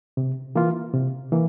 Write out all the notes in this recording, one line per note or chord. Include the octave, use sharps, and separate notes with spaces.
C3
E3 A#3 F4
C3
E3 A#3